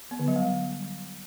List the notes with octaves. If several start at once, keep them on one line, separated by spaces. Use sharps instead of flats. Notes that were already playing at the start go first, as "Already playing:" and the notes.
B3
D3
F#3
G3